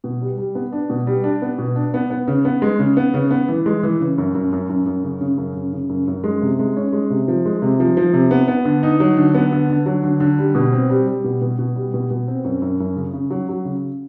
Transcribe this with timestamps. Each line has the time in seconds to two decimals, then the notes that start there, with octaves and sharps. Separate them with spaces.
0.04 B2
0.21 G3
0.38 G3
0.55 B3
0.73 D4
0.90 B2
1.07 G3
1.24 D4
1.42 B3
1.58 B2
1.76 D4
1.94 B3
2.10 B3
2.28 C#3
2.45 B3
2.62 G#3
2.79 C#3
2.97 B3
3.14 C#3
3.31 B3
3.49 E3
3.66 G#3
3.83 E3
4.01 C#3
4.18 F#2
4.35 F#2
4.52 F#2
4.69 F#2
4.86 F#2
5.04 C#3
5.21 C#3
5.37 F#2
5.55 C#3
5.73 C#3
5.89 F#2
6.07 F#2
6.24 G#3
6.42 C3
6.59 G#3
6.77 C#4
6.93 G#3
7.10 C3
7.28 F3
7.46 G#3
7.62 C3
7.80 F3
7.97 F3
8.13 C3
8.31 B3
8.48 B3
8.65 D3
8.83 D#4
9.00 F#3
9.17 D3
9.34 B3
9.52 D3
9.70 D3
9.86 F#3
10.04 D3
10.20 D3
10.39 G3
10.55 B2
10.73 C4
10.90 G3
11.07 G3
11.24 B2
11.41 B2
11.59 B2
11.76 G3
11.94 B2
12.10 B2
12.28 C4
12.44 F#2
12.62 F#2
12.80 F#2
12.96 C#3
13.13 C#3
13.31 F#3
13.49 F#3
13.65 C#3